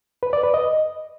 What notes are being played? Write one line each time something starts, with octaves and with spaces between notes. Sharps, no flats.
B4
D5
B4
D#5